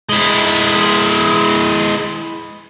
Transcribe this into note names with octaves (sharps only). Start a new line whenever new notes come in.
G#3 E4